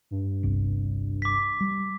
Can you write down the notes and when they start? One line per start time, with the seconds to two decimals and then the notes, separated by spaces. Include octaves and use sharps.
0.11 G2
0.43 G1 C2
1.22 D6 B6
1.61 G3